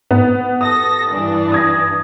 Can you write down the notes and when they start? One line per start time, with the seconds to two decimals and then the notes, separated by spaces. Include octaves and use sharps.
0.11 G#2 B3
0.61 A4 D#6 A#6
1.11 G2 E3 D4
1.52 D#6 G#6 A#6